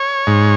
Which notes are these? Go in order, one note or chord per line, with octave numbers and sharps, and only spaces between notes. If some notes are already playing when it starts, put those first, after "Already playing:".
Already playing: C#5
G#2